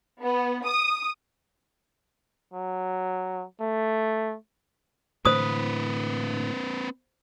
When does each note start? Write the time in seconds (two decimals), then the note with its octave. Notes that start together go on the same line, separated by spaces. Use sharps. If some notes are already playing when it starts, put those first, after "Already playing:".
0.21 B3
0.65 D#6
2.53 F#3
3.61 A3
5.25 A2 D3 E3 C4 B4 C5 D#6